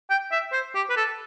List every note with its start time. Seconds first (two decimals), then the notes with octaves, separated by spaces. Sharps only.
0.10 G5
0.32 E5
0.53 C5
0.75 G4
0.90 B4
0.97 A4